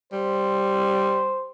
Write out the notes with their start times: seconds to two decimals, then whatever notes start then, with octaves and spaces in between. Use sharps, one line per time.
0.12 G3 C5